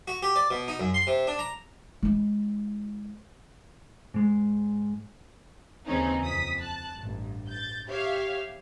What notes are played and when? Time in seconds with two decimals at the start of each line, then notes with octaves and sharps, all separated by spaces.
0.08 F#4
0.23 G4
0.36 D5
0.51 B2
0.68 D#4
0.80 F#2
0.94 C6
1.07 C3
1.27 D4
1.39 A#5
2.03 G#3 E4
4.14 G#2 G#3
5.87 D#2 C#3 E3 C4 C#4 D#4
6.23 F2 D#6 B6
6.58 A5 F#6
6.97 A1 G2
7.48 G6 A6
7.88 G4 C#5 E5 F5